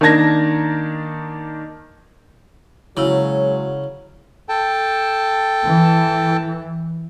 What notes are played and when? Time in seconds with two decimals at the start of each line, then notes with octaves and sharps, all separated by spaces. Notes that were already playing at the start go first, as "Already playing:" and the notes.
0.01 D#3 A#3 D4 A5 G#6 A#6
2.97 C#3 F#3 G#3 E4 C#5 E6
4.49 A4 G5 A5
5.64 E3